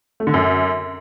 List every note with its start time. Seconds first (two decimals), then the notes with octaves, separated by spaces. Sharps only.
0.20 A3
0.27 D3
0.34 F#2